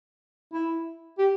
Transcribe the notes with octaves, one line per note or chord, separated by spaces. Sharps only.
E4
G4